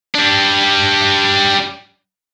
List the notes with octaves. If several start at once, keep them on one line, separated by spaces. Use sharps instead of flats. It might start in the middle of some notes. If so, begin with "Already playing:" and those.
G3 D4